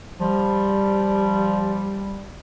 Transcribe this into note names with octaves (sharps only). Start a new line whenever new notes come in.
F3 G3